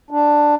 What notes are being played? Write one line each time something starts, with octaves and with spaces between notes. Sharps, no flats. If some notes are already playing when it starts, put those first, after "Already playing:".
D4